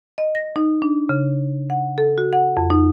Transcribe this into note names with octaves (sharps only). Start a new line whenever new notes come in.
D#5
A#6
D#4
D4
C#3
F#5
A4
F#4
F#5
F2
D#4